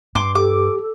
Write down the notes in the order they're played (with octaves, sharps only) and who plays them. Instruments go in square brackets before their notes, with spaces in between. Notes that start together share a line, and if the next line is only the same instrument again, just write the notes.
[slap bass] G2 [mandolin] C6 D6
[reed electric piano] G4 [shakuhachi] A4 [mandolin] D6